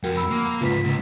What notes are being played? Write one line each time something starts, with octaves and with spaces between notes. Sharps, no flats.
F2 F#4 A#4 F#5 G5
B5 E6
A#3
G#2 C#3 F4 B4 B6
C#2